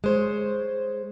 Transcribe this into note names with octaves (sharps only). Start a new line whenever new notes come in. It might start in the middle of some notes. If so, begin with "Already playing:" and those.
G#3 C5 C#5